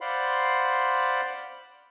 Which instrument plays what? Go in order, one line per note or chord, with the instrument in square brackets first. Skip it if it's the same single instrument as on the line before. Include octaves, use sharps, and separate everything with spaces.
[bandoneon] C5 D5 F5 F#5 B5 C6